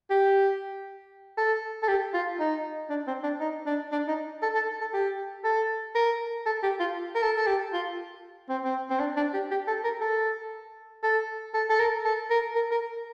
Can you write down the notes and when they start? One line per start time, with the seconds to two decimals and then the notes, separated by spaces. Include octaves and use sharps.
0.10 G4
1.38 A4
1.83 A4
1.89 G4
2.14 F4
2.40 D#4
2.90 D4
3.07 C4
3.23 D4
3.40 D#4
3.66 D4
3.92 D4
4.08 D#4
4.43 A4
4.55 A4
4.81 A4
4.94 G4
5.44 A4
5.95 A#4
6.46 A4
6.63 G4
6.80 F4
7.15 A#4
7.23 A4
7.37 A4
7.47 G4
7.73 F4
8.49 C4
8.64 C4
8.90 C4
9.00 D4
9.17 D4
9.34 G4
9.51 G4
9.68 A4
9.84 A#4
10.01 A4
11.03 A4
11.54 A4
11.70 A4
11.79 A#4
12.05 A4
12.30 A#4
12.56 A#4
12.72 A#4